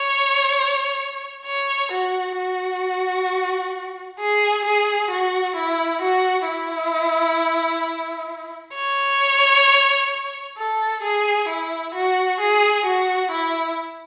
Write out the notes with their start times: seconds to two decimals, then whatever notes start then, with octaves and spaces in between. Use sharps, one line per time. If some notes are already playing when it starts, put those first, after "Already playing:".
Already playing: C#5
1.46 C#5
1.92 F#4
2.37 F#4
4.19 G#4
4.65 G#4
5.10 F#4
5.56 E4
6.02 F#4
6.47 E4
8.75 C#5
10.58 A4
11.03 G#4
11.48 E4
11.95 F#4
12.40 G#4
12.86 F#4
13.31 E4